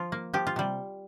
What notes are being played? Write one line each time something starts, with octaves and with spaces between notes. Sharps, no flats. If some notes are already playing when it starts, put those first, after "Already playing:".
Already playing: F3 F4
A#3
F3 G4
F4
C3 G3